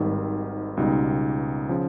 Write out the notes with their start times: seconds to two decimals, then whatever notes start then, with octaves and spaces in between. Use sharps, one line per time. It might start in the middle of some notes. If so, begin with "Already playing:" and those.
Already playing: G#1 G#2 D#3 G3
0.77 C#2 B2 G3 B3 D#4
1.69 C#3 F3